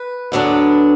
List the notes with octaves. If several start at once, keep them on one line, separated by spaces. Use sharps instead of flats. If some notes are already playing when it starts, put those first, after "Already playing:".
Already playing: B4
D2 D3 F#3 B3 D4